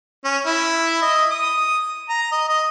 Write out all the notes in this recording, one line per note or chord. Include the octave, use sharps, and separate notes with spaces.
C#4
E4
D#5
D#6
A#5
D#5
D#5